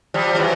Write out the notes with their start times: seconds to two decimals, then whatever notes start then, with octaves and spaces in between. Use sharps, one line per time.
0.14 F3 G3
0.35 G3
0.40 E3 F#3